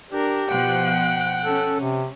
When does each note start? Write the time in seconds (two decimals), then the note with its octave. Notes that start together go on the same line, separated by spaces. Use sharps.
0.11 D4 G4 A#4
0.51 B2 F3 F#5 G5 F#6
1.45 C#4 A4
1.81 C3